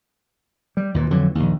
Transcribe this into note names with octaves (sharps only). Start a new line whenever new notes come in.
G3
D#2 A#2 E3
F2 D3 E3 F#3
A#1 D#2